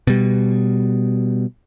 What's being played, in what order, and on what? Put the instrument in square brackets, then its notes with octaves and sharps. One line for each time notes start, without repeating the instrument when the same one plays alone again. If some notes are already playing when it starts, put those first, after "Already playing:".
[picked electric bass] B2 G3